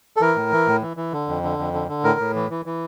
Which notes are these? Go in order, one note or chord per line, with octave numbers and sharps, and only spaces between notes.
A4
E3 A#4
A2
E3
A2
E3
E3
D3
F2
D3
F2
D3
D3
A2 A#4
A2
E3
E3
E3